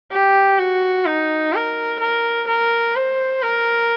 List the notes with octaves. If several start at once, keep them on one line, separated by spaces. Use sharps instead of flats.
G4
F#4
D#4
A#4
A#4
A#4
C5
A#4